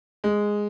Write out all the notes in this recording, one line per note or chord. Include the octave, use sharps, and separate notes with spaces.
G#3